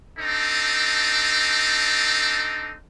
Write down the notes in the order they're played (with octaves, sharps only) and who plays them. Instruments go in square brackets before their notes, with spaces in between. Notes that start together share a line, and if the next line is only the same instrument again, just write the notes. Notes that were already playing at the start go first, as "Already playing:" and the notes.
[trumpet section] C4 D4 D#4 A4